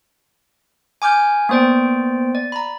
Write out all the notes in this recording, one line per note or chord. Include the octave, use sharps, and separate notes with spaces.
G#5 D6 F6 G6
A#3 B3 C5 D5 G5
D5
A#5 B5